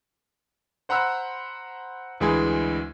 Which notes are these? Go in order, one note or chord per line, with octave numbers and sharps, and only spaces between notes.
C5 F#5 A#5 B5 E6 F#6
D2 E3 G#3 G#4 B5 G#6